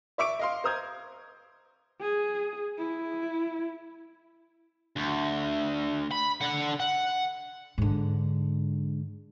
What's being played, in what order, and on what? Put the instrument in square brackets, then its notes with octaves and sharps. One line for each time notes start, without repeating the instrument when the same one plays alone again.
[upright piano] D5 E5 C#6 D6 D7
D#5 F5 C6
C5 A#5 D#6 G6 G#6
[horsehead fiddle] G#4
E4
[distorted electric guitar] D2
B5
D3 F#5
F#5
[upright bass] G#2 D3